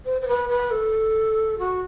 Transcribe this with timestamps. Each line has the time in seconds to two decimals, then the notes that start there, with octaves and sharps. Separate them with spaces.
0.05 C5
0.21 C5
0.28 B4
0.49 B4
0.71 A4
1.59 F#4